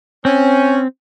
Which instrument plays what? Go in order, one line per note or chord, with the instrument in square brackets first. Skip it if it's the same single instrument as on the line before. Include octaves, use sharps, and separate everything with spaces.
[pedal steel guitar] C4 [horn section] C#4